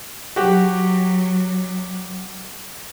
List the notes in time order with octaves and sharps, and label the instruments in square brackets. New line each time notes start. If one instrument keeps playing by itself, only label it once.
[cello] F#3 [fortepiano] F#4 G4